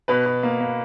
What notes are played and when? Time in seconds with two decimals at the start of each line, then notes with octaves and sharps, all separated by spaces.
0.08 B2 B4
0.26 B2
0.43 A#3
0.61 A#3